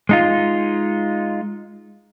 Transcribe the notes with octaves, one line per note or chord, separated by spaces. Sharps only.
G#3 D#4 F4